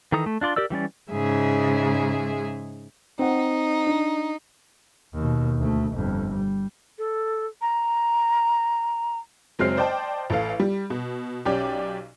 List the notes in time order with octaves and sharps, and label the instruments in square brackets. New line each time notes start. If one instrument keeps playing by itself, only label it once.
[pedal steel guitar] D#3 E3 A4 A#5 D#6
A3
D4 F4 D5 C6
G4 A#4 D5 E6
E3 G3 C#4 D5
[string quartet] G#2 C#3 G#3 G#4 E5
[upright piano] C4 F#5 [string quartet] D#4
[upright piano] D4
[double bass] D#2 B2
D2 A3
G1 F2
G3
[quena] A4
A#5
[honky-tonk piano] F#1 F#3 G#3 C4 F6 C7
C5 D5 D#5 G5 A5
A1 A4 F5
G3
B2
B1 C#4 G4 D5